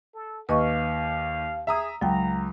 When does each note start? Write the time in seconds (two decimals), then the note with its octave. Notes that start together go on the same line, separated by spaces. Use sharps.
0.14 A4
0.49 D#2 B4 D#5 F5 C#6
1.67 G#4 E5 A#5 D#6
2.01 C#2 F#3 G5 A#5